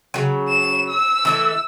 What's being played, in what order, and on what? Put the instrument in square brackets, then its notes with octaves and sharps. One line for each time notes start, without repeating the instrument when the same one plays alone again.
[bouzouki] C#3 F#3
[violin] E7
E6
[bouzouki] E3 A3 E4